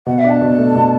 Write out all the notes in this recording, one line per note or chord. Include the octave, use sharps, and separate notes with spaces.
B2 F#5
E5
D4
A5
B2
A3
B2